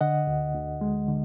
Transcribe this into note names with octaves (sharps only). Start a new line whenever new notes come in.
D3 D#5 F#5
D2
D2
G#3
D3